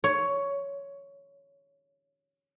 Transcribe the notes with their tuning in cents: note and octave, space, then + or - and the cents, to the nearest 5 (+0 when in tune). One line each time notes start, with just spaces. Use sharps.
C#5 +10